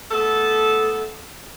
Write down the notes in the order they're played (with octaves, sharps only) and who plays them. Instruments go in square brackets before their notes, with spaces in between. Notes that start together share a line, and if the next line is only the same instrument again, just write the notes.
[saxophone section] A3 B3 A4